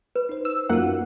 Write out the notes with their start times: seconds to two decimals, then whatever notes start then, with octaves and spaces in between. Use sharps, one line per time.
0.16 B4
0.29 D#4 C5
0.45 E6
0.69 F#2 A#3 D#4 F4 F#4 F#5